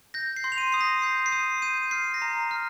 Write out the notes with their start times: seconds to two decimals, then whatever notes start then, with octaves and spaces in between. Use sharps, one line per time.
0.14 G6 A#6
0.37 C7
0.44 C6
0.52 F7
0.58 D#7
0.72 D#6 C7
0.81 A#6
1.02 G6 C7
1.26 C7
1.32 D#6 D#7
1.62 G6 D#7
1.91 F6 C7
2.14 A#6
2.22 A#5
2.51 F6